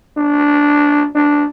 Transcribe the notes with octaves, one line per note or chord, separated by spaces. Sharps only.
D4
D4